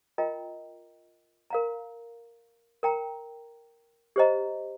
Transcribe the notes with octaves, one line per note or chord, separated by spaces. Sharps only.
F4 A#4 D#5 G5 A#5
A#4 F5 A#5
A#4 G5 A#5
G4 C5 D#5 A#5